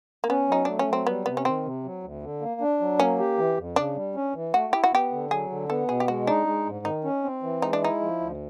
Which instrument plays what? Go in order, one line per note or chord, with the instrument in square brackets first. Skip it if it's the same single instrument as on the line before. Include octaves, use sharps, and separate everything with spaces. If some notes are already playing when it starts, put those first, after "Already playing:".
[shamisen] A#3
[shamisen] B3 [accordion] C#4
[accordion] F#3 [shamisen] D#4
[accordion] A3 [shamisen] D4
[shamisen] C#4
[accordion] F#3
[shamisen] C4
[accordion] G3 [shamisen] B3
[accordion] C3 [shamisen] B3
[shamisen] C#4
[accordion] D#3 [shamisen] C4
[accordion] C3
F#3
D2
D3
A#3
D4
F#3
[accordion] A#3 [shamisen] C#4
[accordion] G4
E3
F2
[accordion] C#3 [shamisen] D4
[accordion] G3
C#4
E3
[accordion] A3 [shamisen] F#4
[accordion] E4 [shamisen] G4
[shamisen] F#4
[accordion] B3 [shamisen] G4
[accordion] D3
[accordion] F#3 [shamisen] G#4
[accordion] D3
[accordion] B3 [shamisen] A4
[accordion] B2 [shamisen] G#4
[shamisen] G4
[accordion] G#3 [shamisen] F#4
[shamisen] D4 [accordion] D#4
[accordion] G#3
G#2
[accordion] D#3 [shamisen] D#4
[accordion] C#4
C4
E3
[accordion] G#3 [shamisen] D#4
[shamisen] D4
[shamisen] D#4 [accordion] E4
[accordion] F3
D2